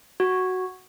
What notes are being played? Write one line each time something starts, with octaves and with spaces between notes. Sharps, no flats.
F#4